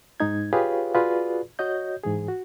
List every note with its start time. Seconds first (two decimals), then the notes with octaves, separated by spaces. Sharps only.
0.20 G#2 G#3 D#4 G#6
0.53 F4 G4 G#4 B4 C#5 F5
0.95 F4 F#4 G#4 B4 D5
1.59 F#4 C#5 D#5 G6
2.03 G#2 E3 G#4
2.28 F#4